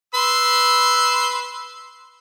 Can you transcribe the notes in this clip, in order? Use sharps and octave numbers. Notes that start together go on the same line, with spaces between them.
B4 C6 E6